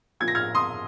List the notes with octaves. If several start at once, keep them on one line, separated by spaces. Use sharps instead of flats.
A#2 F3 G#6
A#6
F6 G#6
C6 D#6